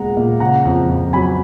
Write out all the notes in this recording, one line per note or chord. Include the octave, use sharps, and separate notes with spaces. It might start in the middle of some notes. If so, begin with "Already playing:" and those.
Already playing: A#2 G#3 B3 F#5 A#5
A#2
C#3 F#5 A#5
F2
F2
F#3 G#5 B5